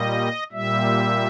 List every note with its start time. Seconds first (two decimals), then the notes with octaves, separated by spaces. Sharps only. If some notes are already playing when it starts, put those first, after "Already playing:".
Already playing: A#2 G3 D#5
0.52 A#2 G3 E5